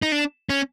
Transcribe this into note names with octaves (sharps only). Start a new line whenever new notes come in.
D#4
D4
C#4